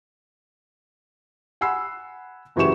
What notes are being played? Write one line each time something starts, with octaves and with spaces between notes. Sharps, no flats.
F#5 G#5 B5 E6 C7
F#1 E3 F#3 G4 C#6 E7